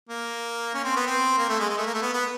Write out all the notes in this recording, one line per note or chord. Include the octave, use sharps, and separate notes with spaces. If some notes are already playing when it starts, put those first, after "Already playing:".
A#3
C#4
C4
B3
C4
A#3
A3
G#3
G#3
A3
A#3
A3
B3
B3